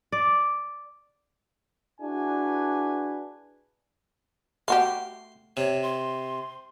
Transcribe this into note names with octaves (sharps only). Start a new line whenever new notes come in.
D5
D4 E4 F#4 G#4 B4 G#5
A3 F#4 G4 C6
C3 C#5
C6